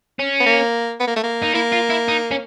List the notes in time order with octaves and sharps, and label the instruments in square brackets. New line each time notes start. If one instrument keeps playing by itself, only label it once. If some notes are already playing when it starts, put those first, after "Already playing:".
[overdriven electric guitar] C#4
[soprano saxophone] B3
A#3
B3
A#3
A3
A#3
[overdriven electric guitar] D#4
[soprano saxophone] A#3 [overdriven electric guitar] E4
[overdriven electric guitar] F4
E4
D#4
C#4